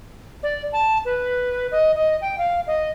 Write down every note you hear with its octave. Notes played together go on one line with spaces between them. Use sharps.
D5
A5
B4
D#5
D#5
G5
F5
D#5